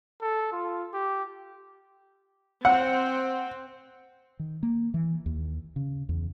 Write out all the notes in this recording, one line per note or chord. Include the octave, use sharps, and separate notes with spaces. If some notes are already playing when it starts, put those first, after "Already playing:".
A4
F4
G4
C4 F#5
D#3
A#3
E3
D#2
C#3
E2